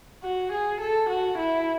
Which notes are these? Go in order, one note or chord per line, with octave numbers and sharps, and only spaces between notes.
F#4
G#4
A4
F#4
E4